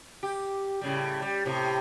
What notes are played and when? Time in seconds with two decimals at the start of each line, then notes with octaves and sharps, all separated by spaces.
0.23 G4
0.81 A2 C#3 G3
1.22 G3
1.45 A2 C3